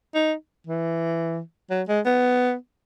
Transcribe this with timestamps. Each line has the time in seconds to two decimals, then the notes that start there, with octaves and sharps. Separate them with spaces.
0.15 D#4
0.67 E3
1.70 F#3
1.88 G#3
2.06 B3